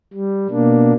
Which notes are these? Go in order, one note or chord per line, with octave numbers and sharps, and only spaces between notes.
G3
B2 A#3 D4